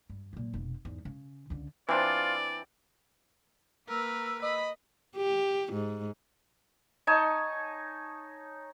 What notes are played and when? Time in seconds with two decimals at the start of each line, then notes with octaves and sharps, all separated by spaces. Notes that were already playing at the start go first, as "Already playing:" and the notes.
0.10 G2
0.33 A#2 F#3
0.53 F1 B2
0.85 E2 G#2
1.05 C#3
1.50 C#2 D3
1.89 E3 C4 D4 F4 D5
3.88 A#3 A#4 B4 E6
4.43 D#5 B5
5.16 G4
5.73 G#2
7.07 D#4 C#5 G#5 A5